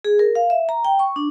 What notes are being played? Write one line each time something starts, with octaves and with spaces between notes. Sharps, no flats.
G#4
A#4
F5
E5
A#5
G5
C#6
D4